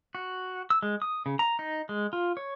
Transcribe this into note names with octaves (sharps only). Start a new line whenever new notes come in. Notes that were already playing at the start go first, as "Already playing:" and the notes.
F#4
E6
G#3
D#6
C#3
A#5
D#4
G#3
F4
C#5